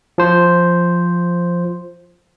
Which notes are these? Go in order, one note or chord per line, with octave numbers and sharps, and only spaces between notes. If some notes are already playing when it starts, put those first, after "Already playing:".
F3 C5